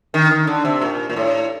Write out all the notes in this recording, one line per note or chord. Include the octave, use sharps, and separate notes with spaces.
D#3
D#3
D3
C3
A#2
A#2
A2